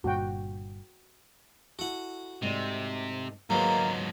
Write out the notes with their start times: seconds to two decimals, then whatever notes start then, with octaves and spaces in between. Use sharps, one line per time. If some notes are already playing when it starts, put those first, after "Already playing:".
0.04 G1 G2 A#2 F#4 G5
1.79 E4 F#4 A4 F#5
2.42 G#2 C3 A3 D5
3.50 D#2 G#2 F#3 G#3 A#3 F4 B4